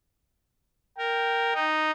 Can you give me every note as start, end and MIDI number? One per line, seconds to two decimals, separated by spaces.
0.98 1.53 70
0.98 1.67 79
1.54 1.91 63